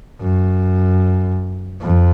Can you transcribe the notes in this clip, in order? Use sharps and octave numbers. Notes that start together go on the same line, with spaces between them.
F#2
F2